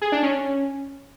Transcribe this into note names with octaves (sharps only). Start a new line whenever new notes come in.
G#4
D4
C#4